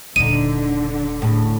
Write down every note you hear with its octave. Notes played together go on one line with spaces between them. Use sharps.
D#1 D3 D4 D#4 D#7
A2 C#3